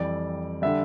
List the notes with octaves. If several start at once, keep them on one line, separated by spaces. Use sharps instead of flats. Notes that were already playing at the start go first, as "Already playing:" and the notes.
Already playing: F2 E3 G3 D5
D3 G3 E5